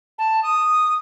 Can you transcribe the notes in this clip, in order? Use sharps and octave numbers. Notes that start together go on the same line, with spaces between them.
A5
D#6